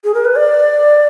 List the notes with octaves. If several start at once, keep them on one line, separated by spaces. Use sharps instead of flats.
G#4
A#4
B4
D5